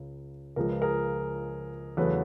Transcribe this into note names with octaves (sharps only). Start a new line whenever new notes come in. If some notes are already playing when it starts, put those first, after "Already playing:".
Already playing: C#2 C#3
C#2 C#3 F3 G#3 A#4
B4
G#4 A#4
E2 C#3 F#3 A3 C#4 A4 B4